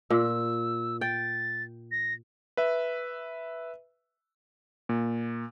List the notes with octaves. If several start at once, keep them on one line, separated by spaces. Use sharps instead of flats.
A#2 E6
G5 A6
A#6
B4 E5
A#2